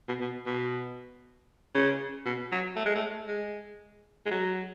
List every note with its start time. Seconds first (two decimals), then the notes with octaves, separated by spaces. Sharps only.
0.08 B2
0.21 B2
0.46 B2
1.75 C#3
2.26 B2
2.52 F#3
2.76 A3
2.86 G#3
2.95 A3
3.28 G#3
4.26 G#3
4.31 F#3